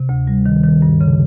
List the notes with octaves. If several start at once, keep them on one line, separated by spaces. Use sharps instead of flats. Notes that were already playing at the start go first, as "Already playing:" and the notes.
Already playing: C3
D2
G3
D#3
D#3
G2
C#3